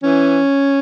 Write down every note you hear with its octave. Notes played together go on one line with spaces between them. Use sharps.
E3 C#4